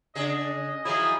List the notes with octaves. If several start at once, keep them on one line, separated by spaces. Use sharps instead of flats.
C#3 D4 G#4 D#5
D#3 F3 F#3 E4 G#4